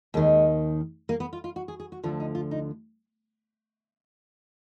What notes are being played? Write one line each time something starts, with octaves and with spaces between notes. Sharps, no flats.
D#2 D#3 G#3
A#3
B3
F4
F4
F#4
G#4
G#4
F#4
D2 D3 F3 F4
D#4
F4
D#4